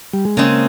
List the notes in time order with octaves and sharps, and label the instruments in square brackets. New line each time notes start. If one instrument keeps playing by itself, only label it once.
[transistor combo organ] G3
G#3
[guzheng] C#3 G#3 C4 [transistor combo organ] A#3